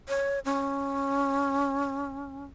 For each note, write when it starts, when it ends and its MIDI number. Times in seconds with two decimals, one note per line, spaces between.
0.08 0.39 73
0.45 2.45 61